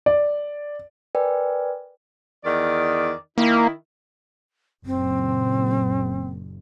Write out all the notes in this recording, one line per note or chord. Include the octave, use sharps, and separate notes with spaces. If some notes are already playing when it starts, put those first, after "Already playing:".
D5
A#4 B4 D5 G5 G#5
E2 D#3 D5
D#3 A#3 E4
F#1 A#2 C4